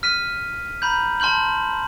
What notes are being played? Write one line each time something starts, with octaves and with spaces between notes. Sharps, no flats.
F6 B6 D#7
A#5 B5 G6
A5 C6 F6 G6 F#7